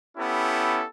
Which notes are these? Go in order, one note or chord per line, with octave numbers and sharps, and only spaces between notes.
B3 C#4 E4 G4 A4